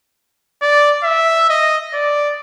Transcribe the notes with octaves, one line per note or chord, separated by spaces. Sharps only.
D5
E5
D#5
D5